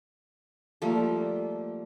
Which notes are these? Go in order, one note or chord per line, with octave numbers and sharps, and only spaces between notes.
F3 G3 A3 A#3